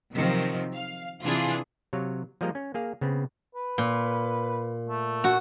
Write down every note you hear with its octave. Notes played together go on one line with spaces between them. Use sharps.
C3 D#3 F3 F#3 C4
F5
C3 E3 D4 F4 G#4
C3 F#3 C#5 F5
F3 G3 G#3 A#3 D#5 A#5
C#4
A#3 G#4 F5
C#3 B3 C4
B4
A#2
A3
F#4